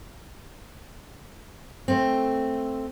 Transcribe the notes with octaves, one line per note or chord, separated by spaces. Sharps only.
A3 C4